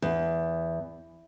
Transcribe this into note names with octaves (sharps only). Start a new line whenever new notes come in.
E2